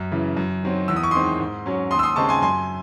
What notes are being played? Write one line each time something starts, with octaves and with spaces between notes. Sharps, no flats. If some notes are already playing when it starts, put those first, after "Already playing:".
Already playing: F#2
C#3 E3
F#2
D#3 F#3 C4
E2 E6
D#6
C#6
D#3 G#3 C4 C6 D#6
G#2
F#3 C#4
D#2 C6 D#6
E6
C6 D#6
C#3 G#3 C4 A5 C#6
G#5 C6
F#2 G#5 C6